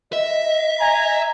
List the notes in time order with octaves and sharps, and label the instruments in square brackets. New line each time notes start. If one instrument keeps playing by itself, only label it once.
[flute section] D#5 [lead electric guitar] E5
[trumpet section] G#5 A#5